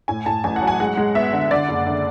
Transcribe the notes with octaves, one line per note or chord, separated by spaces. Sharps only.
A2 G#5
A2 A5
A1 G#5
F#5
F#3
G#5
G#3 F#5
G#3
B3 E5
D3
D3 D5
F#1
D3